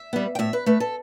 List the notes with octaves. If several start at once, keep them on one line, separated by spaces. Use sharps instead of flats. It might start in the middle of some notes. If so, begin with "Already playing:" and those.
Already playing: E5
G3 B3
G5
A2 E5
B4
A3 B4
A4